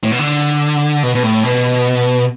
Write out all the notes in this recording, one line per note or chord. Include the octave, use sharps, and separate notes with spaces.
A2
B2
D3
B2
B2
A2
B2